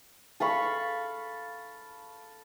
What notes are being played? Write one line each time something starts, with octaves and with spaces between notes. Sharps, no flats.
A4 F5 B5 C#6